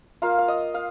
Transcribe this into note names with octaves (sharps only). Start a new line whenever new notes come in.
A#3 F4 F5
F5
D#5
F5